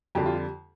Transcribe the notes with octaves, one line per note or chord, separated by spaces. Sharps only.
F2 D3 G3 G4
F4